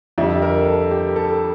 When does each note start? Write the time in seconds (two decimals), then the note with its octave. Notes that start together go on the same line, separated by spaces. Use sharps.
0.18 F2 D3 G3 E5
0.42 A#4
0.66 A4
0.91 G4
1.16 A4